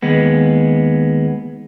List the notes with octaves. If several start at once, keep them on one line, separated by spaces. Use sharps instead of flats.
D#2 G#3 B3